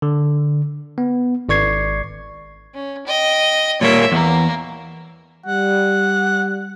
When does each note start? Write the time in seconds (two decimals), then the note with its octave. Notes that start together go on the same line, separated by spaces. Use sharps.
0.02 D3
0.98 B3
1.49 G#1 D5 C#6 G#6 C7
2.74 C#4
3.07 D#5 G5
3.81 A#2 G3 A#3 C#5 E5
4.12 E2 A#3
5.46 G3 F#5